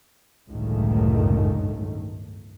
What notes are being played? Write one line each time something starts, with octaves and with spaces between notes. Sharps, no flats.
G1 C#2 F#2 A2 D#3 A3